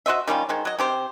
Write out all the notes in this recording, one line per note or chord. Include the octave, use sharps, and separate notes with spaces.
F#4 C5 D#5 E5
D#3 G3 C#4 F4
D#3 G#3 C5
F#3 D#5
C3 G4 C5